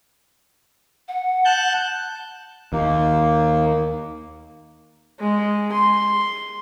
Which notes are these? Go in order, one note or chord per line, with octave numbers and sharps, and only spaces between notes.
F#5
A5 F#6 G6
D#2 A#3
G#3
C6